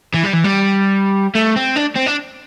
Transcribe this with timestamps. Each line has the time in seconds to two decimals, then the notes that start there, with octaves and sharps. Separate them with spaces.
0.14 E3
0.24 G3
0.34 E3
0.44 G3
1.35 A3
1.56 C4
1.76 D4
1.96 C4
2.06 D4